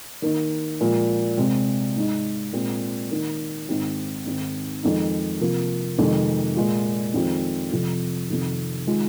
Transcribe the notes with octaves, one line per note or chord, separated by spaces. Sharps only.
D#3 A#3 D#4
A#2 F3 G#3
C3 G#3 C4
G#2 G#3 D#4
A#2 G#3 C4
D#3 A#3 D#4
G#2 D#3 C4
G#2 D#3 C4
F2 D#3 G#3 D#4
C3 F3 A#3
F2 C3 D#3 G#3
A#2 G#3 F4
F2 D#3 G#3 C4 F4
F2 C3 F3
F2 C3 D#3
D#3 G#3 F4